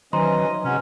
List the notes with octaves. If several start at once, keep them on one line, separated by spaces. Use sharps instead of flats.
D#3 E3 F#3 C#4 C5 D#5 A#5 C6
C3 G#3 C#4 F#4